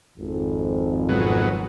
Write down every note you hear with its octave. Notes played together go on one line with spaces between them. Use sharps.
G#1 F2
G#2 B2 F#3